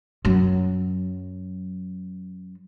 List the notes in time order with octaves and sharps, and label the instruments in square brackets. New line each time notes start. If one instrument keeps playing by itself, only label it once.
[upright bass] F#2 F#3